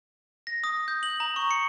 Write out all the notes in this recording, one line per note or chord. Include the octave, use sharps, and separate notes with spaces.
A#6
D#6
G6
F#7
A#5
C#6
C#7